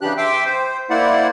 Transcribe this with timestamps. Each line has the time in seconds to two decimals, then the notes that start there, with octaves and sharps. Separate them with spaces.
0.01 C#3 E3 D4 G4 F#6
0.18 E5 G5 C6 D6 E6
0.45 C5
0.90 A#3 E4 C5 D5 F#5